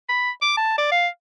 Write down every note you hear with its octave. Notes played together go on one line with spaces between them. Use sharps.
B5
D6
A5
D5
F5